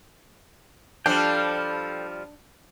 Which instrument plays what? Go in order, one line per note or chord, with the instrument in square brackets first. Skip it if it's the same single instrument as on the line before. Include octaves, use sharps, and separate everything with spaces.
[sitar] F3 G3 [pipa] D4 [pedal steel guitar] A4 F5 G5